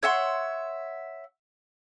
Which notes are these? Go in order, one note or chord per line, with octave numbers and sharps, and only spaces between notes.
C#5 E5 F#5 C6